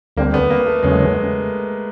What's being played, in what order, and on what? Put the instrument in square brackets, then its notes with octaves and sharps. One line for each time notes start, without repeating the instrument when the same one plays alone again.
[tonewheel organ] D2 D3 G3 C4 [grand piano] A#3
[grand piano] B3
A#3
A3
[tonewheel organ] E2 C#3 F#3 A3 C#4 [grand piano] G#3